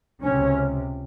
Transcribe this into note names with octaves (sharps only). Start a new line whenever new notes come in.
C#2 C3 C#4